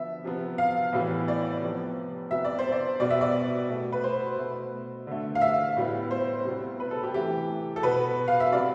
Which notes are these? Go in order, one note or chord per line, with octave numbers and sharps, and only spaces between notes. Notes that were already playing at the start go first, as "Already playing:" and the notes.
Already playing: D3 F3 B3 E5
C3 F3 B3
F5
A2 E3 G3 B3
D5
C3 F3 B3
C3 G3 B3 E5
D5
C5
D5
B2 G3 B3 D5
E5
D5
B2 A3
B4
C5
B2 A3
D3 A3
F5
E5
A2 G3 B3
C5
C3 G3 B3
B4
A4
G4
C3 E3 A3 G4
A4
B2 B3 B4
F5
E5
C3 G3 B3 D5